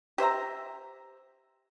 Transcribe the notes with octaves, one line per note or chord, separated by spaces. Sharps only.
G4 C5 E5 A#5